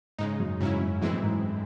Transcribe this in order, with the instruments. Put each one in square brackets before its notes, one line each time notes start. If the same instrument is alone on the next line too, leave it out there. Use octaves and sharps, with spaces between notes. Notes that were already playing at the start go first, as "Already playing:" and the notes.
[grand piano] G#2 [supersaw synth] C#3 G#3 D#4
[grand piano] F#2
[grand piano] G#2 [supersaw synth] C#3 F#3 C#4 E4
[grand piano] F#2
[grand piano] F#2 [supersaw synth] A2 E3 G#3 C4 E4
[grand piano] F#2
G#2